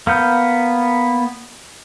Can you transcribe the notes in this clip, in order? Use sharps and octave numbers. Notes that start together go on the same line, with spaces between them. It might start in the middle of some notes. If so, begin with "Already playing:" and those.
A#3 B3 G6